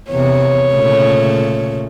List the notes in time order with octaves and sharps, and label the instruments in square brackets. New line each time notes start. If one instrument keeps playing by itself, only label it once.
[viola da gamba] E2 C3 [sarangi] C#5
[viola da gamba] A#2 C#3 A3